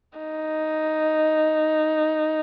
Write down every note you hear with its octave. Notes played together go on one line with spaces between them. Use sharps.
D#4